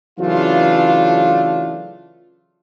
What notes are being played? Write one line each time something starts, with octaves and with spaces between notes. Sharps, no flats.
C#3 E3 F#3 A3 D4 F4